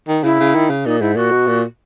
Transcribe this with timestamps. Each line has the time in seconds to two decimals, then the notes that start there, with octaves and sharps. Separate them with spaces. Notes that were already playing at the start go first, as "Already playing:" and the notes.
0.09 D#3
0.23 C#3 E4
0.40 C#3
0.55 D#3
0.70 C#3
0.85 A#2 D#4
1.01 G#2 E4
1.16 A#2 F#4
1.32 B2
1.47 A#2